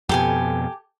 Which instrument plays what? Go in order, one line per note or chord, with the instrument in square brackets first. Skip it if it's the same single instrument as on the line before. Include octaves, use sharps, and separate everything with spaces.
[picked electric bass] F2 B2 [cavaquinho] G4 A4 G#5